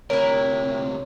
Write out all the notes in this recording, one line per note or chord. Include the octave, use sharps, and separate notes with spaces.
D2 C3 E4 A#4 C#5